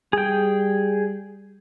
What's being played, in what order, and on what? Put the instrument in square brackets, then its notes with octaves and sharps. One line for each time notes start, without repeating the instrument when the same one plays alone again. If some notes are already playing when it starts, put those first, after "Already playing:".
[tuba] G3 [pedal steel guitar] G#4 G5